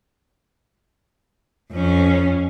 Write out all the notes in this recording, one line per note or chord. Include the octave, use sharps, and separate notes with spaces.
F2 C#4